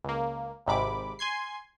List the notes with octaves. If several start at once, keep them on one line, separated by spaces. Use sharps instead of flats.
C#2 A#3
G#1 G#2 C3 B5 D6
G#5 C6 G#6 C7